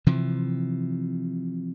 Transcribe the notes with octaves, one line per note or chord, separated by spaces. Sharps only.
C3 E3 F3